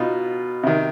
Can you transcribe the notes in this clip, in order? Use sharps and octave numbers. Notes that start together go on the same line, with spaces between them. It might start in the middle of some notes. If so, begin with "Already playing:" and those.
Already playing: B2 D#4 F4
C3 D#3